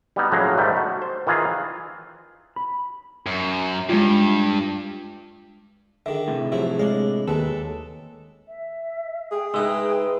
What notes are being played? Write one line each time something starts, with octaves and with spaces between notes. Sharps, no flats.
G3 B3 D#4
A2 C#3 F3 F#3 A#3
G#2 D#3 G3 A3
F#4
C5
D#3 E3 F4 G#4
B5
F#2
G2 G#3 F4
D3 D#3 G#4 E5
A2 C3 E3
F3 F#3 E4 G4 G#4 E5
G#3 D4 C#5 F5
D#2 G#3 A4 B4
E5
G#4 G5
G#3 D#4 B4 E5 G5